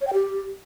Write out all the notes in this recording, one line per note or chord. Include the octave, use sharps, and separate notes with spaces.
C#5
G5
G4